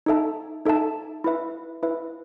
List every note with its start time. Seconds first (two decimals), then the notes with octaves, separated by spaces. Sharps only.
0.06 D#4 A4 E5 A5
0.65 D#4 A4 E5 A5
1.24 E4 B4 E5
1.83 E4 B4 E5